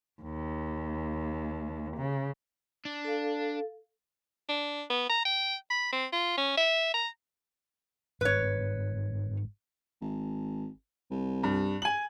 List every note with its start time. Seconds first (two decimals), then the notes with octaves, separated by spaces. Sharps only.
0.23 D#2
1.97 C#3
2.85 D4
3.05 A4 F5
4.49 D4
4.90 B3
5.09 A#5
5.25 G5
5.70 B5
5.92 C4
6.13 F4
6.37 C#4
6.57 E5
6.94 A#5
8.21 G1 G#2 B4 C#5
10.01 G#1
11.11 C2
11.43 G2
11.82 G#5 F#7